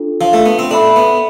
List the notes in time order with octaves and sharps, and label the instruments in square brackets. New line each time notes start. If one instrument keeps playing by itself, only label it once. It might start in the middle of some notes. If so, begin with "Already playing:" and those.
Already playing: [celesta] D4 F4 A4
[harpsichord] F3
A3
B3
C4
[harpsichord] D4 [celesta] A4 E5 B5
[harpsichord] B3